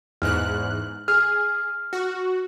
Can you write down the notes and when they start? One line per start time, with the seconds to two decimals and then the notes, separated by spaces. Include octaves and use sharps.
0.22 E2 G#2 F6 F#6
1.08 G#4 F6
1.93 F#4